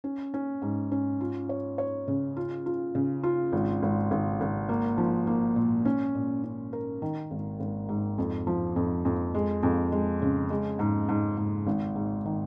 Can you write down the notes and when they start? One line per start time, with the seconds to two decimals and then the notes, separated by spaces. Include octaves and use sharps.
0.04 C#4
0.34 C#4
0.62 G#2
0.91 C#4
1.21 F4
1.49 C#5
1.78 C#5
2.08 C#3
2.37 F4
2.66 F4
2.95 C#3
3.23 F4
3.53 G#1
3.83 G#1
4.11 G#1
4.41 G#1
4.69 A#3
4.98 F3
5.27 A#3
5.56 A#2
5.85 C#4
6.15 A#2
6.44 C#4
6.73 A#4
7.02 D#3
7.31 G#1
7.60 G#1
7.89 G#2
8.18 F2
8.47 F3
8.76 F2
9.05 F2
9.34 G#3
9.63 F2
9.92 G#3
10.22 C#3
10.50 G#3
10.79 G#2
11.09 G#2
11.38 G#2
11.67 G#1
11.96 G#2
12.25 D#3